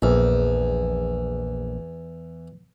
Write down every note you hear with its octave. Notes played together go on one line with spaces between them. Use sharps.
A#1 E2